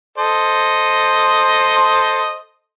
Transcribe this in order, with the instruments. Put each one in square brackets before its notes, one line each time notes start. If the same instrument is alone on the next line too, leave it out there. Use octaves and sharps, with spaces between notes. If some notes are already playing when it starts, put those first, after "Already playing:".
[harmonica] A4 C5 D#5